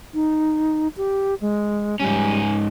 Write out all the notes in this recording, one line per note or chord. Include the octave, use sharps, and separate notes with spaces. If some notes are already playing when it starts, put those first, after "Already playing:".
D#4
G4
G#3
G#2 G3 C#4